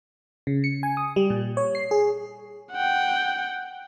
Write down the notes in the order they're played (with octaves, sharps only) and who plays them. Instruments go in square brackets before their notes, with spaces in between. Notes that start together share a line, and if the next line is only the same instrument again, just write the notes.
[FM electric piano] C#3
C#7
G#5
D#6
G3
A#2
C#5
C7
G#4
[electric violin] F#5 G5